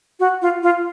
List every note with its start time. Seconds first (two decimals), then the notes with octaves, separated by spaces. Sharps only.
0.20 F#4
0.42 F4
0.63 F4